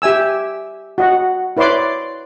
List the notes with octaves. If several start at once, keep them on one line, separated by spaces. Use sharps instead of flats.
G4 E5 G#5 E6
F#4 D#5 F#5
E4 B4 C#5 D5 C6 D6